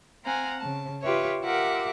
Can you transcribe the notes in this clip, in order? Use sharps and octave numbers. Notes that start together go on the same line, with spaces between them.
C4 F5 F#5 G#5 A#5
C#3 A5
F4 G4 B4 C#5 E5
F4 G4 A#4 E5 F#5 D6